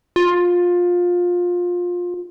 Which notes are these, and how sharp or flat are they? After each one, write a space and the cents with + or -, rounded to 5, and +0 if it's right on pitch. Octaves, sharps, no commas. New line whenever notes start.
F4 +20